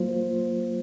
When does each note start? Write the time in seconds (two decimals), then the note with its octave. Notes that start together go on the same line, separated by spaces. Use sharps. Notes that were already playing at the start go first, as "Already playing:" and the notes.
Already playing: F#3 A#3 F4 C5